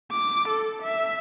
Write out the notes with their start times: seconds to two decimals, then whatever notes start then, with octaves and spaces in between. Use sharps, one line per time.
0.11 D6
0.48 A4
0.82 E5